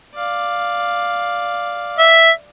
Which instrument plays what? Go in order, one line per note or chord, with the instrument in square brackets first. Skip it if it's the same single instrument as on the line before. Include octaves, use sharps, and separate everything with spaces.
[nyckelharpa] D5 F5
[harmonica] E5